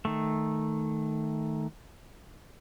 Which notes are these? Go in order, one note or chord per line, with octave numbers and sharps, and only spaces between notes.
D#3 A3